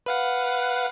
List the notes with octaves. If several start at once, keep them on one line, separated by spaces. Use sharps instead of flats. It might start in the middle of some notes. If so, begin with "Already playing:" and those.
B4 F5 F#5